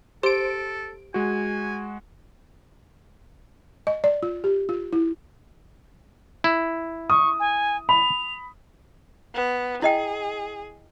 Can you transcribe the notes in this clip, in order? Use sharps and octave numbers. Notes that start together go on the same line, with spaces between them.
G4 A4 C5 D7
G#3 F#4 G#5
D#5
D5
F4
G4
F4
E4
E4
C#6 D#6
G#5
B5 F7
B3
E4 G#4 D#5 G5